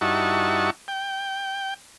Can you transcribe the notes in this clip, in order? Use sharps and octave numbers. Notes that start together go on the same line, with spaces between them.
G2 D#4 E4 F#4 A5 C#6
G5